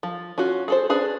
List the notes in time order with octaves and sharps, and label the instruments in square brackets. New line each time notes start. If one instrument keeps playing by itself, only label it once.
[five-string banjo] F3
C#4 F4 F#4
G#4 A4 C5
C#4 D4 G#4 B4